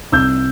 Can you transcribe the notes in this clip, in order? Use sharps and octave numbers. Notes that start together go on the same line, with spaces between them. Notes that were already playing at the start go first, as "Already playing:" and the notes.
C2 E6 G6